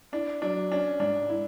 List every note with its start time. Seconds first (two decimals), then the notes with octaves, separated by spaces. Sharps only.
0.12 D4 E4
0.42 F#3 D4
0.71 C#4 D4
0.99 G#2 D4
1.29 E4